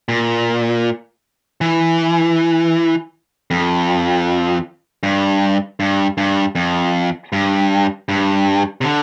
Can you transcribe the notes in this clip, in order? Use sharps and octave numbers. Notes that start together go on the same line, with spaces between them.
A#2
E3
F2
G2
G2
G2
F2
G2
G2
C3
D3